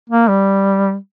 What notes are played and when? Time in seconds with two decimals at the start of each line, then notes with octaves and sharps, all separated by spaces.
0.10 A#3
0.29 G3